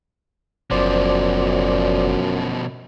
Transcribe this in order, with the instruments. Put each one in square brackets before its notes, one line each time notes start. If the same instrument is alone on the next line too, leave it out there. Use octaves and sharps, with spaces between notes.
[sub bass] F#1 [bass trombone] F#2 [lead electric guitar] B2 F3 [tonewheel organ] C5 D5